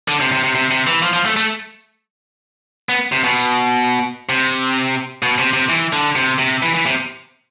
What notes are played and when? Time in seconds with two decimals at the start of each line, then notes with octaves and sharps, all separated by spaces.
0.08 D3
0.20 C3
0.32 C3
0.44 C3
0.55 C3
0.71 C3
0.87 E3
1.02 F3
1.13 F3
1.25 A3
1.36 A3
2.89 B3
3.12 C3
3.24 B2
4.29 C3
5.22 B2
5.38 C3
5.53 C3
5.69 E3
5.93 D3
6.16 C3
6.39 C3
6.63 E3
6.75 E3
6.86 C3